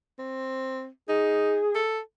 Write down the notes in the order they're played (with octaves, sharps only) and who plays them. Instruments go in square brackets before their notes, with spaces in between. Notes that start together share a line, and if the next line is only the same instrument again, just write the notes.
[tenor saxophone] C4
[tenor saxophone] D#4 [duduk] G#4
[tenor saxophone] A4